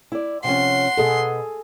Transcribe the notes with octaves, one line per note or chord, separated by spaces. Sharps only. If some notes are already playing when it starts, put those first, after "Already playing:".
E4 D5
C3 F3 C#4 F#5 C6
B2 B3 G#4 A4